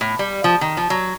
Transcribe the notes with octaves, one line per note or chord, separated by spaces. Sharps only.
A2
G3
F3
D#3
F3
F#3